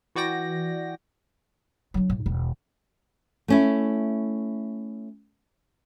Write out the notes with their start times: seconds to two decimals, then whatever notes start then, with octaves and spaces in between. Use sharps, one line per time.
0.15 E3 F#4 D5 G5 A#6
1.94 F#3 D4
2.10 A2
2.26 E1 D#3
3.48 A3 C#4 E4